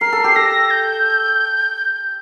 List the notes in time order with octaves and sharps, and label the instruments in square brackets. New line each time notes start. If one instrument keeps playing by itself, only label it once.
[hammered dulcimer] A#4 [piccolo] C7
[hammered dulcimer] A4
G4
[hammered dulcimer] A4 [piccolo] A#6
[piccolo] G6